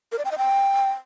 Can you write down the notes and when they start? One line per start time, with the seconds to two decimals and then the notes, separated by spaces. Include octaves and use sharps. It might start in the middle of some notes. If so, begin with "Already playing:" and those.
0.12 A#4
0.18 D5
0.25 G5
0.31 D#5
0.38 G5